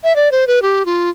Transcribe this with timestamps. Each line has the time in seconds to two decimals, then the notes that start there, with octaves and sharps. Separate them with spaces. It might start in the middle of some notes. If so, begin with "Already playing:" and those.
0.04 E5
0.16 D5
0.31 C5
0.47 B4
0.62 G4
0.85 F4